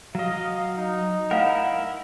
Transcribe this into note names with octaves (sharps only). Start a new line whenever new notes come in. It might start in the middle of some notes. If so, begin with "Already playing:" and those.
F#3 D#5 F5
D#4
E4 A#4 F5 F#5